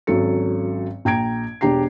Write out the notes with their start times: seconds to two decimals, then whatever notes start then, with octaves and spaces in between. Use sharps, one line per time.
0.07 G#1 F#3 C#4 A4 C#7
1.05 A#1 G5 A#5 G#6 D7
1.61 E1 D4 G4 A#5 C7